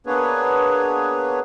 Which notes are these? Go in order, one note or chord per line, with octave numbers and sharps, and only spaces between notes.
A#3 B3 D4 G#4 B4 C#5